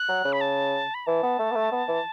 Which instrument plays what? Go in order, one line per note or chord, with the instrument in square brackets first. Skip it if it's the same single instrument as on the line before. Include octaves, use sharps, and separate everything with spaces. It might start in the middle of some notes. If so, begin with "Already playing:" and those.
Already playing: [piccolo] F#6
[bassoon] F#3
C#3
[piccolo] B5
A5
B5
[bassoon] E3 [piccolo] A5
[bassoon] B3
A3
B3
A3
B3
E3